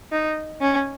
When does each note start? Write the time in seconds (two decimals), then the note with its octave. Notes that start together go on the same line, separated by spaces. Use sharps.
0.12 D#4
0.61 C#4